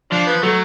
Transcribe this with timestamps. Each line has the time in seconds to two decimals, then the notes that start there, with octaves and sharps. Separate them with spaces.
0.12 F3 D4
0.27 B3
0.42 F#3 A3